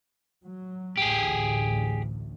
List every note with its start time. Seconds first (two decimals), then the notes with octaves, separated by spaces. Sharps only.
0.44 F#3
0.97 A1 D2 A2 G4 G#4